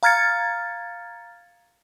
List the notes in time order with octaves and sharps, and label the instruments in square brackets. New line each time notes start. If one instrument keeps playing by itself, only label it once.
[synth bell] F5 A#5 F6 G#6 A6 C#7